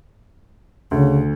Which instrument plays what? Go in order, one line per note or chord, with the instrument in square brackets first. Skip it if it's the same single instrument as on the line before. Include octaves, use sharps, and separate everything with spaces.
[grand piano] D2 [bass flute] C#3